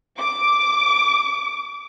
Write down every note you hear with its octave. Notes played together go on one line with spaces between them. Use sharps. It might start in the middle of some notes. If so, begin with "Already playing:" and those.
D6